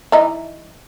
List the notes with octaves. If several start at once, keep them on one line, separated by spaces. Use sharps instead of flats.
E3 D#4 E4